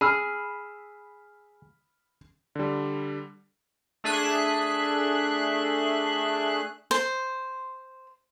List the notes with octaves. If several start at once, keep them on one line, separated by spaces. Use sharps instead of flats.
G#4 B5 E6 F6
D3 G3
A3 D4 G#4 E5 F#6
C5